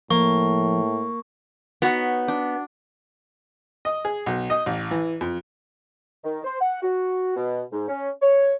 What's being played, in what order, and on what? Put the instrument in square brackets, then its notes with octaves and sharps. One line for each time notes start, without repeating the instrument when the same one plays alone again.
[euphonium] A2 [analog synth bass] F3 [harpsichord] A#3 [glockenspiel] C#6
[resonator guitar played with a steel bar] B3 [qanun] D#4 F#4 C#5
[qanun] D4
[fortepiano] D#5
G#4
B1
D#5
A1
E3
F2
[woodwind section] D#3
C5
F#5
F#4
B2
G#2
C#4
C#5